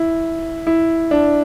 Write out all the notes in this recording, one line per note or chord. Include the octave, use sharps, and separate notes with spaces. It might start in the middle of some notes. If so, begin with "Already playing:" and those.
Already playing: E4
E4
D4